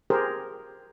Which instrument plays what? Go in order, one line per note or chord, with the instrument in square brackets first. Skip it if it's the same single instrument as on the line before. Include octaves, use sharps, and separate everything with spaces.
[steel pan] G4 G#4 A#4 C5